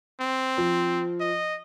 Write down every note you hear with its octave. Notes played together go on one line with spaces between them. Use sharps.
C4
F3
D#5